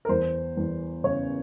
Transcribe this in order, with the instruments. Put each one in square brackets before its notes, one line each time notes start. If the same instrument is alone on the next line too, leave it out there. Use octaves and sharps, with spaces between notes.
[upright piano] A#4
E2 C5
E2
C#3 C#5